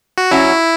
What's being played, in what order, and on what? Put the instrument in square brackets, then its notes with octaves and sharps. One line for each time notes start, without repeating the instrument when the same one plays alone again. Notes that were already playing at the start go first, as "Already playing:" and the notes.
[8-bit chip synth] F#4
[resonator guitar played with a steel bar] F#3 C#4 F#4 [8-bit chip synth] E4